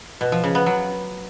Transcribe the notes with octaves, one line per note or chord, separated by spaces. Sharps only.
B2
F3
C#3
B3
F#3